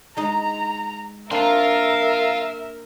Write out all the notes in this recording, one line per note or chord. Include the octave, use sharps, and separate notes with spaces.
G#3 D#4 A#5
A#3 C4 D4 A#4 E5 F5 C6